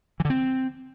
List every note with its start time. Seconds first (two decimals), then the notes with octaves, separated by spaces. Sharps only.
0.20 E3
0.25 D3
0.30 C4